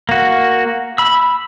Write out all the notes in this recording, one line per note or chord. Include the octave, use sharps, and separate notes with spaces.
A#3 F#4
B5 E6